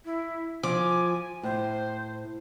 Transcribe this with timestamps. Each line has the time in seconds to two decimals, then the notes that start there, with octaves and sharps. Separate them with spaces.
0.05 E4
0.63 F3 G#5 D6
1.43 A2 C5